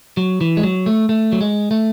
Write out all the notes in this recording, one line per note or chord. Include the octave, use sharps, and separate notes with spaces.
F#3
E3
G#3
F#3
A3
A3
F#3
G#3
A3